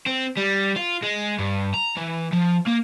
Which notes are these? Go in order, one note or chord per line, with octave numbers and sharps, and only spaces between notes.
C4
G3
F4
G#3
G2
A#5
E3
F3
A#3